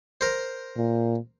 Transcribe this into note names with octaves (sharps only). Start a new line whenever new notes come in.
A#4 C5
A#2